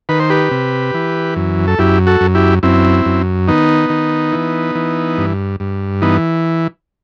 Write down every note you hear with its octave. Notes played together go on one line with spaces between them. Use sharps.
D#3 B4
C5
G4 B4
C3
E3
F#2
A4
F#2 E4 G4
F#4 A4
F#2
E4 G4
F#2 C4 E4
F#2
D#3 B3 D#4
D#3
E3
E3
G2
G2
E3 B3 D#4